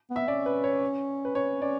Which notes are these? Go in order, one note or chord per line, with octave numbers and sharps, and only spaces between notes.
B3
E5
C#4 D5
B4
C#5
B4
C#4 C#5
C#4 D5